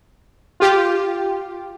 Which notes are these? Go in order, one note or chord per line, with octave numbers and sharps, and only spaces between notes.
F4 G4